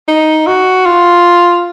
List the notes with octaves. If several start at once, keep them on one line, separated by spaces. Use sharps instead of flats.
D#4
F#4
F4